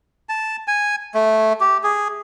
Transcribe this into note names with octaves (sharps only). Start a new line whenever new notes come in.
A5
G#5
A3
G4
G#4